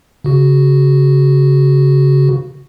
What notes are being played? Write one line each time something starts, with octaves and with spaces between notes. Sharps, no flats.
C#3 F#4